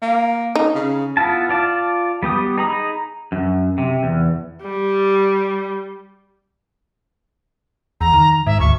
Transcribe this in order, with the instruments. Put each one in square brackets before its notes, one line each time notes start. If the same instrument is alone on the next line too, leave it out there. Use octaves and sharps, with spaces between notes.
[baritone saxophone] A#3
[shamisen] D#4
[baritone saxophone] C#3
[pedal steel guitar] B3 E4 F4 A5
F4 D5 A5
G3 B3 G4 D#6
D#4 G#4 A#5 B5 D#6
[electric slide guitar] F#2
C3
E2
[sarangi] G3
[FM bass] E2 [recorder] A#5
[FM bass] D#3
[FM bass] G#2 [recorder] E5
[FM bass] D2 [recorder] C#6